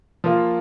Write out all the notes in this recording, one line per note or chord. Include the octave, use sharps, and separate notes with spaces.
F3 A#3 F4